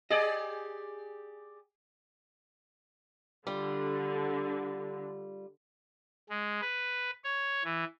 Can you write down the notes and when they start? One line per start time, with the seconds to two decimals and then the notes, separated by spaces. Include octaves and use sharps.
0.10 G4 G#4 D5 D#5
3.47 D3 G3 F4
6.29 G#3
6.61 B4
7.24 C#5
7.64 E3